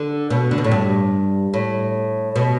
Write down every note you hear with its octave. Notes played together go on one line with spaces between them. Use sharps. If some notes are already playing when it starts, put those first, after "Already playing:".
Already playing: D3
B2
D3
B2
A2
G2
A2
B2